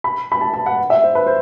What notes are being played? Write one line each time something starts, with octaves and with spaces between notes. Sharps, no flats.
B5
B5
A5
A5
F#5
E5
C5
B4
C5